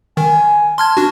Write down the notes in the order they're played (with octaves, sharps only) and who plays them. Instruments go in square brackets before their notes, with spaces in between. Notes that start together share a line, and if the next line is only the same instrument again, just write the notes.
[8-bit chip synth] D#3 [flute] G#5
[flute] A5 [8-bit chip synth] C6 F6 G#6
[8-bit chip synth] D4 F#4